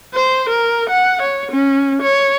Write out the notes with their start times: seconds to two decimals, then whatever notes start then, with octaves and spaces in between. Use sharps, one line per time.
0.14 C5
0.49 A#4
0.89 F#5
1.22 C#5
1.51 C#4
2.02 C#5